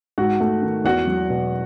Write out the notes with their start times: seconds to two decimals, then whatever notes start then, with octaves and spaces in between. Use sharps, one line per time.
0.18 G#2 F#4 F#5
0.40 A3
0.62 D#3
0.84 E2 F#4 F#5
1.07 F#3
1.30 B2